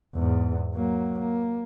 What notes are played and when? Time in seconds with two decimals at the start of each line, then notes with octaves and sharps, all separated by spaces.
0.15 E2 G#2
0.75 F#3 A#3
1.19 A#3